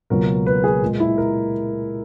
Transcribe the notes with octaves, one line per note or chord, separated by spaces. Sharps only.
C#2 B2 F#3 A#3 A#4
B4
G#4
A#2 G#3
E4
A#4